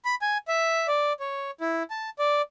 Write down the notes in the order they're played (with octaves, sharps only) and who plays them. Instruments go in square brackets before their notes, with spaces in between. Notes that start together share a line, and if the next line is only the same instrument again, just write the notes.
[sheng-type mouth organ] B5
G#5
E5
D5
C#5
E4
A5
D5